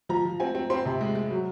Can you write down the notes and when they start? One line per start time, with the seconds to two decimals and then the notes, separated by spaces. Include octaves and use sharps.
0.09 F3 A#5
0.25 F3
0.40 C4 G#5
0.55 C4
0.70 C4 C6
0.85 C3
1.01 G#3
1.15 G#3
1.31 F#3